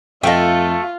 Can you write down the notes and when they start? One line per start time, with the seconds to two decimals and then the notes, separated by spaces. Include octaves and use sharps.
0.23 F2 A3 F4 A4 D#5 F5 G5